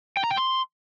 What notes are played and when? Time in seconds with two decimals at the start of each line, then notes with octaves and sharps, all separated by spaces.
0.17 G5
0.24 A#5
0.31 G5
0.37 C6